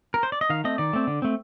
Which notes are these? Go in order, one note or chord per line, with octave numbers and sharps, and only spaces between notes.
A#4
C5
D5
D#5
D#3 F5
A3 C4 D#5
D#3 D5
A3 C4
D3
A3 C4